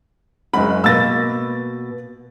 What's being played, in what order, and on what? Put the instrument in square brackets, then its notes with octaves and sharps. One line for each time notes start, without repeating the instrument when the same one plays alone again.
[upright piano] F#1 G#3 B5 [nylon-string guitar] F#2
[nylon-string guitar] B2 A#3 [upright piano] E6 A6 A#6